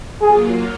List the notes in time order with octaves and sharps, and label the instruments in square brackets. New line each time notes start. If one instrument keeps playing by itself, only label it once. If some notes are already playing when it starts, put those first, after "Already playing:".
[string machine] F#3 A#3 F4 [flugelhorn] G#4